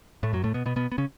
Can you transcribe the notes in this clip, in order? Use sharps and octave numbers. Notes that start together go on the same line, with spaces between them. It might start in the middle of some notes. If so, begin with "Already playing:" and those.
A2 A3
F#2 F#3
A2 A3
B2 B3
B2 B3
B2 B3
B3
C#3 C#4